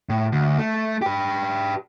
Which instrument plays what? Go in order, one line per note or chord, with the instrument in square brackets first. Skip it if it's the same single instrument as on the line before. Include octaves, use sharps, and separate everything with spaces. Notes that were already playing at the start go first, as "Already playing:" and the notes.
[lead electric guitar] A2
D2
A3
G4 B4